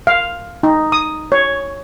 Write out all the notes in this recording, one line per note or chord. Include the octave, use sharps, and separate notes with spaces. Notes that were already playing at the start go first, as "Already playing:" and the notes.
F5
D#4
D#6
C#5